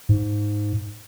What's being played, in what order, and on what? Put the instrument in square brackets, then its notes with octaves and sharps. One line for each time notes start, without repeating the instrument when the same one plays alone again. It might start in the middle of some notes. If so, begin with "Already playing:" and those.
[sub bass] G#2